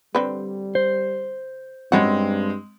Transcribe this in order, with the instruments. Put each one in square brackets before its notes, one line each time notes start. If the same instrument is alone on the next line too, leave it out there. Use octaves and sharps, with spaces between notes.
[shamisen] D3 C4 B4 [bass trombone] G3
[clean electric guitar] C5
[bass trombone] G2 [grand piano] G#3 C4 [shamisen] C#4 E4 F#4